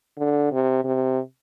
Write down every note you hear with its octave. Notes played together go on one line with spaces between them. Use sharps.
D3
C3
C3